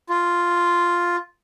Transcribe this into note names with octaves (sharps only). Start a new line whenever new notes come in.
F4